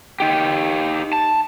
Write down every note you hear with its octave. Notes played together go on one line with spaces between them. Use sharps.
D#4 G4
A5